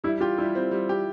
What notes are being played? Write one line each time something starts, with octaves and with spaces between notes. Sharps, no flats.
G3 E4
F4 G4
G3 E4
C4
G3
G4